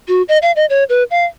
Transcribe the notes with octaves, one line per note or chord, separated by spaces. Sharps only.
F#4
D#5
F5
D#5
C#5
B4
F5